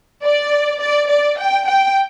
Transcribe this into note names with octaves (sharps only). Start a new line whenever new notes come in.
D5
D5
D5
G5
G5